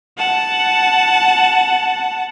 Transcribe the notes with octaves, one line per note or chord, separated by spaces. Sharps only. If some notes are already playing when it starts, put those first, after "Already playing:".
F#5 A5